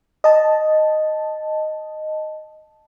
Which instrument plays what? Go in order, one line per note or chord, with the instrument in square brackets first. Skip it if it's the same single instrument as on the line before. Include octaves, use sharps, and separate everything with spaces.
[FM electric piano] D#5 A5